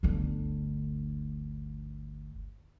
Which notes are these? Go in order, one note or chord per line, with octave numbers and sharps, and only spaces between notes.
G1 D2